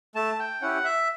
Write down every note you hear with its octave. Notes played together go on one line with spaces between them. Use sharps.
A3 A5
G5
C#4 E4 G4 F#5
E5